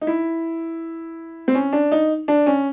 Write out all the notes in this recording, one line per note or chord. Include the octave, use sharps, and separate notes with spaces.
D#4
E4
C4
C#4
D4
D#4
D4
C#4